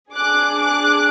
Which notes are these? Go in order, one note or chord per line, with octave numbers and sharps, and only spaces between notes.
D4 G#4 D6 F#6
D6 F#6